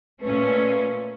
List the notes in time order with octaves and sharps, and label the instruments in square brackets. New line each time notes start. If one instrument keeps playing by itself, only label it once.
[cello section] A#2 A3 C#4 [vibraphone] B4